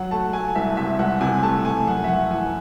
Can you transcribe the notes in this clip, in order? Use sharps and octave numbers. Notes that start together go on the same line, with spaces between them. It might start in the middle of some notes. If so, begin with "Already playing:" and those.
Already playing: F#3 F#5
A3 A5
A3 G#5
C2 E5
C3 E5
C2 F#5
C3 G#5
A3 A5
A3 G#5
F#2 F#5
E5
F#2 F#5
E3 G#5